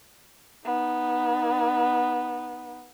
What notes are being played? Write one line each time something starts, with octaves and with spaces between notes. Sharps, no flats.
B3 D#4